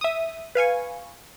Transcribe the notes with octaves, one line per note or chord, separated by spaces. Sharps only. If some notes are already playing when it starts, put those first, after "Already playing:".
E5 D#6
B4 F5 G#5 C#6